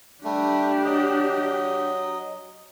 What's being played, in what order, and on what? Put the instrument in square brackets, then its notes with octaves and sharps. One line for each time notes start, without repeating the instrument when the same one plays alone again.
[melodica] G3 A3 [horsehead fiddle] D4 G4
[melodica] F#3 D#5